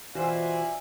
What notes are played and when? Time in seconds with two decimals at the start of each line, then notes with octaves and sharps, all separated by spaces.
0.15 B2 E3 F4 F#4 C5 D5 E5 G#5